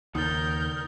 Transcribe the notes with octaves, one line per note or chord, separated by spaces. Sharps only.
D#2 C#3 D#4 A#4 D#6 G6 A6